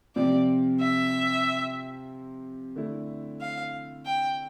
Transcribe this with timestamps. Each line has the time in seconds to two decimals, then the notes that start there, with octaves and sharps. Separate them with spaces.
0.16 C3 F3 C4 F4 D5
0.81 E5
2.76 D3 A3 E4
3.41 F5
4.06 G5